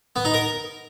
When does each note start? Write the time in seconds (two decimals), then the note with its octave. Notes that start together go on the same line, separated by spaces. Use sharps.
0.16 B3
0.25 D#4
0.34 A#4